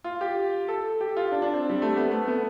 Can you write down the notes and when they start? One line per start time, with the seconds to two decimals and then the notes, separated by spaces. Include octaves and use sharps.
0.04 F4
0.21 G4
0.68 A4
1.01 G4
1.17 F4
1.32 D4
1.42 D4
1.54 C4
1.69 G3
1.82 A3
1.96 B3
2.11 A3
2.28 B3